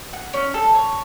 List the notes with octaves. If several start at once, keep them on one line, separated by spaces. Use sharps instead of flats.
F#5
C#4
A4
C#5